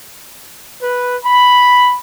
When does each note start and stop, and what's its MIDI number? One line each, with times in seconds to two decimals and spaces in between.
0.81 1.16 71
1.24 1.98 83